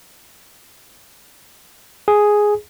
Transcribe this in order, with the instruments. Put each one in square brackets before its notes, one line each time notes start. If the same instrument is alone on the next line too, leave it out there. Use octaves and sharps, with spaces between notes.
[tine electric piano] G#4